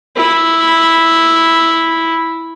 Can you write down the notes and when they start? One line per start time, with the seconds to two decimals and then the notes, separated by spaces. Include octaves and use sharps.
0.16 E4